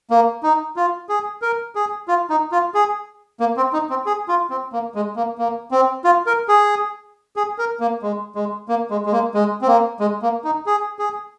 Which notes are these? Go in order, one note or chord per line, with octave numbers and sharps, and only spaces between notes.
A#3
D#4
F4
G#4
A#4
G#4
F4
D#4
F4
G#4
A#3
C4
D#4
C4
G#4
F4
C4
A#3
G#3
A#3
A#3
C4
F4
A#4
G#4
G#4
A#4
A#3
G#3
G#3
A#3
G#3
G#3
A#3
G#3
C4
A#3
G#3
A#3
D#4
G#4
G#4